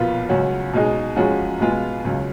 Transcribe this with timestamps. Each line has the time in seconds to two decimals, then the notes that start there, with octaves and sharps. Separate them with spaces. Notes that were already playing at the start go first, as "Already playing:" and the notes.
Already playing: B1 A#2 F3 B3 F4
0.29 C#2 C#3 F#3 C#4 F#4
0.73 B2 G#3 D#4 G#4
1.16 F#2 F3 G#3 C#4 F#4
1.60 B2 G#3 B3 F4 G#4
2.04 C#2 C#3 F#3